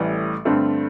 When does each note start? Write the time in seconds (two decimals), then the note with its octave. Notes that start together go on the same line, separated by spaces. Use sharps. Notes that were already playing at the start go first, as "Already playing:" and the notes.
Already playing: A1 A2 E3 G3
0.45 G2 D3 A3 C4